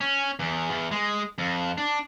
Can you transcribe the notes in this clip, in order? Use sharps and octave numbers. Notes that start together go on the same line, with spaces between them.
C#4
E2
E2
G#3
F2
D4